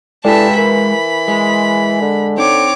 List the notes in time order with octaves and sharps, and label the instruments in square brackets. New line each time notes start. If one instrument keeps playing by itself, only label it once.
[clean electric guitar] G#3 B4 [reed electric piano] E4 A4 D5 [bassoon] G4 [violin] E5 A5
[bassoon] E3 [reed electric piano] A#4 [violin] B5
[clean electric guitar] G#3
[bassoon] D3
[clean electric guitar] C4 [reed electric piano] D#4 [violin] C#5 D6